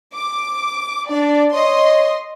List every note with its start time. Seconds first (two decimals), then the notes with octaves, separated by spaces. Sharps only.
0.15 D6
1.10 D4 D5
1.53 C#5 D#5 C6